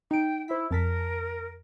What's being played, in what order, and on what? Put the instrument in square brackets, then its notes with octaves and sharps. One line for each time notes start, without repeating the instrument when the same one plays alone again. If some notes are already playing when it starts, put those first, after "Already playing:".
[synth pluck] D#4 D7 [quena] G5
[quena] E4 [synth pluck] C5 B6
[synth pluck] F2 A5 B6 [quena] A#4